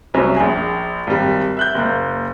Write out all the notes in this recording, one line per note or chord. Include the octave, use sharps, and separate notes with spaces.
C2 F#3 C#4 E5
A#1 G#4
G#1 G3
E5 F#6 G6
F#1 A#3